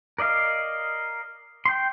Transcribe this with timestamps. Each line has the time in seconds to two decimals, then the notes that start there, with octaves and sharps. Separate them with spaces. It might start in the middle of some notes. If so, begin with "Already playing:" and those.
0.19 A#4 D5 D#5 F5
1.66 G5 C6